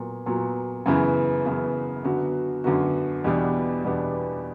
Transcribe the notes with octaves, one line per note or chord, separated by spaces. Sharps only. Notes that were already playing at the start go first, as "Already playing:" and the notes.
Already playing: A#2 F#3 B3
A#2 F#3 B3
F#2 C#3 E3 B3
F#2 C#3 E3 B3
F#2 D3 F#3 B3 F#4
F#2 D3 F#3 B3 F#4
E2 B2 G3 B3 D4
E2 B2 G3 B3 D4